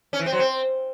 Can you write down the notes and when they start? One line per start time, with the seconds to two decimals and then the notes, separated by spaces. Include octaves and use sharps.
0.13 C#4
0.20 E3
0.26 C4
0.33 F#3
0.39 C4